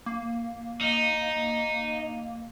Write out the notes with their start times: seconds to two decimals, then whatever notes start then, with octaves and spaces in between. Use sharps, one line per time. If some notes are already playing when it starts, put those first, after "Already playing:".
0.06 A#3
0.81 D#4